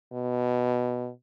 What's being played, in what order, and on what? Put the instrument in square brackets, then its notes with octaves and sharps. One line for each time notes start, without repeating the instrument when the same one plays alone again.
[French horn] B2